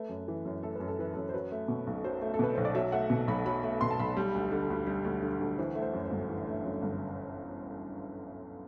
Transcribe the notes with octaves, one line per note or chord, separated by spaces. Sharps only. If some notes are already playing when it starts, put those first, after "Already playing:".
Already playing: A3 B4
F#2
E3
F#2
A3 A4
F#2 B4
A4
E3 B4
F#2 A4
C5
F#3 B4
A3
B2
B1
F#3 C5
A3
A4
B2 B4
B1 C5
D5
F#3 E5
A3 F#5
B2
B1 B5
F#3 B5
A3
B2 C6
A5
B1 B5
G3
D2
D3
D2
G3
D2
D3
D2
E3 C5
A3
C5
F#2
C5
G1
E3
A3
F#2
G1